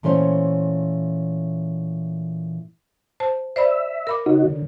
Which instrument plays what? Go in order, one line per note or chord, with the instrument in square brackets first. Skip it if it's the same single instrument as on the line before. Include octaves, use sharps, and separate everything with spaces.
[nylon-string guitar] A#2 E3 A3 C#4 C5 C#5
[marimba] C5 A5
[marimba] C5 D5 B5 [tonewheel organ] E5
[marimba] A#4 B5 D6
[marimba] C#3 [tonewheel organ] D#4 F#4
[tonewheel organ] D3